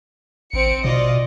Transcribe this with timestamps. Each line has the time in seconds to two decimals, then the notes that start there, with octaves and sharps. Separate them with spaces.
0.54 A1 C4 C#7 D7
0.85 B2 F4 D5 D#5